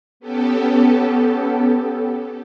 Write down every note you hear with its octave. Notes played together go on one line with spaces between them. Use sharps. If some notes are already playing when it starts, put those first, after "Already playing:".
B3 C#4 G4 A4